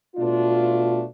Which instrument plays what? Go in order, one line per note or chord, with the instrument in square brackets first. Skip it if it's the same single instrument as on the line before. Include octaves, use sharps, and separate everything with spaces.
[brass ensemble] B2 A3 D4 F4